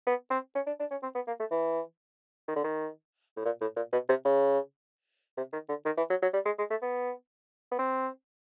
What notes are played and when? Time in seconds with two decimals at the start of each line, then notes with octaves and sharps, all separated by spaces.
0.07 B3
0.31 C4
0.55 C#4
0.67 D4
0.80 D4
0.91 C#4
1.03 C4
1.15 B3
1.27 A#3
1.40 A3
1.51 E3
2.48 D#3
2.56 D3
2.64 D#3
3.37 A2
3.45 A#2
3.61 A2
3.76 A#2
3.93 B2
4.09 C3
4.25 C#3
5.37 C3
5.53 D#3
5.69 D3
5.85 D#3
5.97 E3
6.10 F#3
6.22 F#3
6.34 G3
6.46 G#3
6.59 G#3
6.70 A3
6.82 B3
7.71 B3
7.79 C4